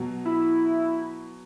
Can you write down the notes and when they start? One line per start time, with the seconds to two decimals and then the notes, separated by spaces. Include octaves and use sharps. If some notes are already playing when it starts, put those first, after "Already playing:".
Already playing: B2 F#3
0.25 E4